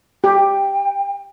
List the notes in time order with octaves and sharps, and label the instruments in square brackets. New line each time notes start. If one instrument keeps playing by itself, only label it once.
[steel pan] G4 [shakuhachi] G5